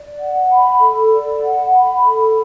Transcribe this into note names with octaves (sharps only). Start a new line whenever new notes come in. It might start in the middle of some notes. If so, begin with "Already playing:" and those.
Already playing: D5
F#5
B5
A4
D5
F#5
B5
A4